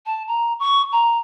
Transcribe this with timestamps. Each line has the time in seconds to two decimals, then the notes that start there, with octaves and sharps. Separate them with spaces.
0.06 A5
0.27 A#5
0.59 C#6
0.92 A#5